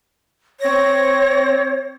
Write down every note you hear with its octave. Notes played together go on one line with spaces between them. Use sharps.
C4 C#5 A#6